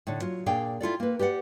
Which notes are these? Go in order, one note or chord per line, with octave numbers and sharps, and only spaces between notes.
A2 D3
F#3 F4
A#2 D4 G#4 F5 G5
E4 F4 A4 D5
A#3 B4
G4 B4 D5 F#5